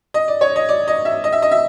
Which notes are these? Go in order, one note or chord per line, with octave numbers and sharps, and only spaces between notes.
D#5
D5
C#5
D#5
D5
D#5
E5
D#5
E5
D#5
E5